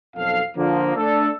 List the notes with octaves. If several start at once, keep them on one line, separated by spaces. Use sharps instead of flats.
B1 F2 A4 F5
D3 F3 A#3
A3 D4 A4